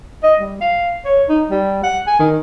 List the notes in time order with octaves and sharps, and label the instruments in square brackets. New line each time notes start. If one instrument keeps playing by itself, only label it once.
[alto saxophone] D#5
G3
F5
C#5
D#4
G3
F#5
G#5
D#3